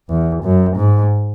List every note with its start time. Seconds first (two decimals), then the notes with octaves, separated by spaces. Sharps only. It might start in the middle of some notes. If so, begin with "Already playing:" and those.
0.09 E2
0.43 F#2
0.77 G#2